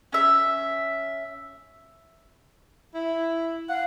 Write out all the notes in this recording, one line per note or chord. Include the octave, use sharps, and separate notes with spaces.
C#4 E5
E4
F5 F#5